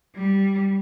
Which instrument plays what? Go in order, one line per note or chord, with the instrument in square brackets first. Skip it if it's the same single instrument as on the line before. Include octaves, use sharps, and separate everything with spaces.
[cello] G3